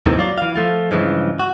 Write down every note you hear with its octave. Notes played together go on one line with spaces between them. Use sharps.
D#2 A2 C3 D#3 E3 C4
F#3 F4 D5
E3 F5
F3 A3 F4
G2 C#3 E3 F3 G#3
F#4